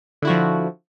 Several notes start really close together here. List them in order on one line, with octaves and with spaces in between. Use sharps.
D3 E4 F#4 F3